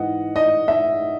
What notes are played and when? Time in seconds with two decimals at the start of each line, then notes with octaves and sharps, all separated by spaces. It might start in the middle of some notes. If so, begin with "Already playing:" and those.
Already playing: G#2 E3 D#5 F#5
0.36 D#5
0.68 E5